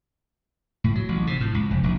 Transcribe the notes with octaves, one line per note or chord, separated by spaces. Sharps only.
A2
F#3
A1
C3
A2
C#2
F1
A#1